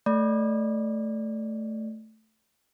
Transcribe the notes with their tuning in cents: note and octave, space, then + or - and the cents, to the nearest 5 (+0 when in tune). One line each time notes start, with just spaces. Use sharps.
A3 +0 D5 -15